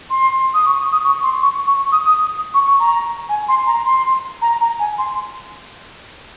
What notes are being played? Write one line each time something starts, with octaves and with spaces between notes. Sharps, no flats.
C6
D#6
C#6
D#6
C#6
C6
C#6
C#6
D#6
D#6
C#6
C#6
A#5
G#5
C6
A#5
C6
A#5
A#5
G#5
C6